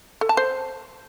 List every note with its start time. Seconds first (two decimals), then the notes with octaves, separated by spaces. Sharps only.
0.21 A4
0.29 A5
0.37 C5